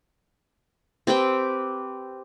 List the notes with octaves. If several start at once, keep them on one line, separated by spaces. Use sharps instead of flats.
C4 G4 B4 G5